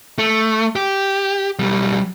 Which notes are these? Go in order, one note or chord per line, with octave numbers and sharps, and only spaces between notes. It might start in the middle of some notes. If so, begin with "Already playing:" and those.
A3
G4
B1 G3